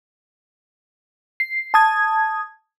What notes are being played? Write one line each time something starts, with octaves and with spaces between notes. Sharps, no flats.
C7
A5 D#6 G#6